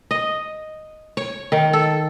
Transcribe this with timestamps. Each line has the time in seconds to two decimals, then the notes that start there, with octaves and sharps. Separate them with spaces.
0.11 D#5
1.17 C#5
1.52 D#3
1.73 A4